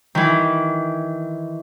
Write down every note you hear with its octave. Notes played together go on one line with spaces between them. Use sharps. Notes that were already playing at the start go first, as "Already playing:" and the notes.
D#3 E3